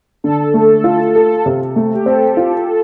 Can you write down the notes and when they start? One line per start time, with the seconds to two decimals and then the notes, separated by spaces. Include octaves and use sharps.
0.24 D3 A4
0.54 A3
0.84 F4
1.15 A4
1.46 C3
1.76 A3
1.95 G4
2.06 C4 A4
2.37 F4
2.67 A4